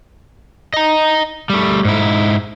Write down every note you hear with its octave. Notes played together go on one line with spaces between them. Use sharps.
D#5 A#5
G3 A3
G#2 E4